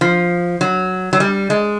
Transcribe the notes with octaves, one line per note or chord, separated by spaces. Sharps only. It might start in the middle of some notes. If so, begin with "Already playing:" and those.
F3
F#3
F#3
G3
G#3